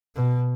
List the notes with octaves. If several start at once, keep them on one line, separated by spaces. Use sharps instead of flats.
B2